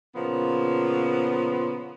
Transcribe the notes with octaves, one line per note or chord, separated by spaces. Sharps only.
A#2 C#3 F3 B3